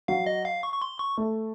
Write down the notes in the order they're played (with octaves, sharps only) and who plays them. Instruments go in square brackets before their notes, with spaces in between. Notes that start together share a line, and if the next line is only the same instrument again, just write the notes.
[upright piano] F#3 [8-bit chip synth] F5
[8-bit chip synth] D#5
F5
C#6
C#6
C6
C#6
[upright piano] A3